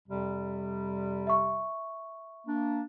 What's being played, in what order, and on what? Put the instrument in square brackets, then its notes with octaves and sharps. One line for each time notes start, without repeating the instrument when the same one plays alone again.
[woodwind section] F2 C3 G3
[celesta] E5 C#6
[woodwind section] A#3 D4